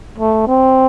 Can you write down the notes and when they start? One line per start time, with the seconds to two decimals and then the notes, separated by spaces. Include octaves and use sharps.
0.18 A3
0.47 C4